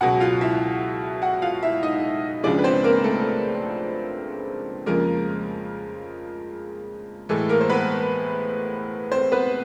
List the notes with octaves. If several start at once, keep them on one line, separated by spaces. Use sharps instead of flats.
C#2 B2 F#3 F#4 F#5
F4 F5
E4 E5
F#4 F#5
F4 F5
E4 E5
D#4 D#5
C#2 C#3 F3 G#3 D4 D5
B4
C4 C5
A#3 A#4
A3 A4
F2 C#3 F3 G#3 A#3 A#4
A2 E3 G#3 A3 A4
A#3 A#4
C5
B3 B4
C4 C5
B3 B4